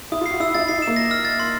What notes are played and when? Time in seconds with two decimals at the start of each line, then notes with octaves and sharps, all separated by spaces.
0.12 E4 D#6
0.21 F4
0.26 F#4 C7
0.40 E4 E6
0.54 E4 A6
0.59 D#4
0.68 E4 C7
0.78 D#4
0.82 E7
0.87 A#3
0.97 A#6
1.11 F6
1.25 A6
1.39 C6